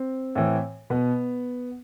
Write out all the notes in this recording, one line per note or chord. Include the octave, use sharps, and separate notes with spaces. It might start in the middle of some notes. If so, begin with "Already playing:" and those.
Already playing: C4
A2 E3
B2 B3